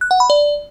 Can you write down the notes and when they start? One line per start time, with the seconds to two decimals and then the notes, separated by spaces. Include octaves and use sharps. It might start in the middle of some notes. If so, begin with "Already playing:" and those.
0.01 F#6
0.11 F#5
0.20 B5
0.30 D5